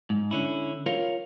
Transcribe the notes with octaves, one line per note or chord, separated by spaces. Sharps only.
G#2
D3 C#4 E4
F4 A#4 C#5 F5